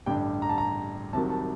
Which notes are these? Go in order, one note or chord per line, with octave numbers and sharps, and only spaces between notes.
A1 G2 D3 G3 G5
A#5
A5
A#5
C2 C3 D#3 F#3 A5
A5